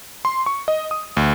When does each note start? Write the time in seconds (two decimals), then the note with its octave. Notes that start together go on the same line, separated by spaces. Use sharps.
0.25 C6
0.46 C#6
0.68 D#5
0.91 D#6
1.17 D2